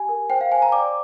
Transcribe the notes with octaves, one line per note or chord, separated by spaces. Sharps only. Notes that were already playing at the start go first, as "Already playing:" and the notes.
Already playing: G4 G#5
A#4
C5 G5
F5
C5 G#5
A#5
D5 D6